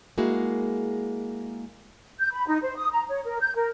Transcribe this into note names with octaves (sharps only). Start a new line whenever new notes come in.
G#3 A#3 E4 F#4 G#4
G6
B5
D#4
C5
D#6
A#5
C#5
A#4
G6
A#4